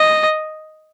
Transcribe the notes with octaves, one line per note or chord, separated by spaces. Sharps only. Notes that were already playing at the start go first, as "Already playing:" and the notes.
Already playing: D#5